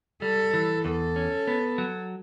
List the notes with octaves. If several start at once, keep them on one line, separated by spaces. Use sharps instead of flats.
G3 A4
E3
E2 A4
C#4
B3
F#3